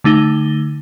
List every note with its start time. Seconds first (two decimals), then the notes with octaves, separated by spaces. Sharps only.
0.04 D3 A3 D#4 G7